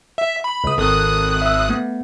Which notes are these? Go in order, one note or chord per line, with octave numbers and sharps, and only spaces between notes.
E5
B5
C#2 D#6
G#1 A4 A#4 D#6 F#6
E5 E6
A3 B3